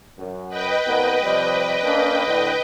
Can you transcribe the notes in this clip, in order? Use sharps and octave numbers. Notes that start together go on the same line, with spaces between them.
F#2
B4 D#5 G5
C2 A#3 B3
C3 F3 G3
A#3 C#4 D4
A2 D3